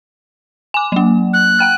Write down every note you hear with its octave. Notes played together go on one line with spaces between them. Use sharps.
G#5 D6
F#3 A#3
F#6
F#5 G5 F6